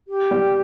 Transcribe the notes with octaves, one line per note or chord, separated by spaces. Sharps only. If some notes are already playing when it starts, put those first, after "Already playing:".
G4
G3